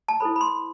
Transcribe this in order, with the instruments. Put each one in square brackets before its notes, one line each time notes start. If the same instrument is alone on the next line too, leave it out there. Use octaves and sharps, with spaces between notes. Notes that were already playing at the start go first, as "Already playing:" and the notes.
[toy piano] A5
E4 A4 C5 B5
B5
C6